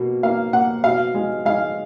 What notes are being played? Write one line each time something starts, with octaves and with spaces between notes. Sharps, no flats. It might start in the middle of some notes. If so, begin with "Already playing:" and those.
Already playing: B2 A#3
A#3 F5
A#3 F#5
B2 F5
G#3
G#3 F5